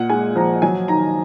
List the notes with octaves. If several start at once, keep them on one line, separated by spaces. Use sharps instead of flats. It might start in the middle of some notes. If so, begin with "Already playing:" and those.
Already playing: A#2 F#5
G#3 G#5
F3 A#5
F#3 G#5
D#3 A#5